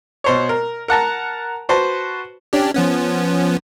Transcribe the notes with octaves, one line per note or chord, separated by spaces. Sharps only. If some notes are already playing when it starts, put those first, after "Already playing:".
B2 C5 C#5
A#4
A#4 F#5 A5 A#5
F#4 B4 C5 A5
C#4 D4 G4
F3 B3 C#4